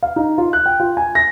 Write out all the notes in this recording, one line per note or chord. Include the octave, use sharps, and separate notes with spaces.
F5
D#4
F4
F#6
G5
F4
G#5
A#6